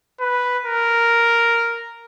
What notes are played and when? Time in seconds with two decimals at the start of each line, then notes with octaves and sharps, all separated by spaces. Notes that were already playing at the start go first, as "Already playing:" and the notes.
0.20 B4
0.65 A#4